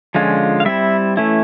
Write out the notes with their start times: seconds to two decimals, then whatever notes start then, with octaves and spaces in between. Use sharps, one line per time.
0.15 D3 F3 G#3 C#4 F4
0.60 F5
0.65 G3 C4 E4 E5
1.17 E3 A3 C#4 E4